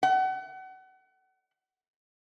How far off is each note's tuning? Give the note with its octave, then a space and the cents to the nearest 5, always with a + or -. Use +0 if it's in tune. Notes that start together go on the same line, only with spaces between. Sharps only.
F#5 +35